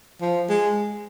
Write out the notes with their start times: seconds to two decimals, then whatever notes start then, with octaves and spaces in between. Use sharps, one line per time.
0.21 F3
0.49 G#3